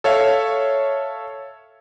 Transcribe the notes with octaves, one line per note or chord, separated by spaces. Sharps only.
A4 C#5 E5 F5